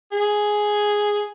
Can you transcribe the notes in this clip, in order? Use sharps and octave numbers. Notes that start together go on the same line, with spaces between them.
G#4